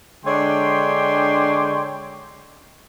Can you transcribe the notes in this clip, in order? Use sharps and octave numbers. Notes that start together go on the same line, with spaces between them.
D3 G#3 D4 C#5 G5 C6